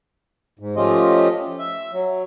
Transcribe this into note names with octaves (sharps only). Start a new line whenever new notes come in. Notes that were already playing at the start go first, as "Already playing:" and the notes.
G#2
F3 A3 C#4 F4 G4 D#5
E5
F#3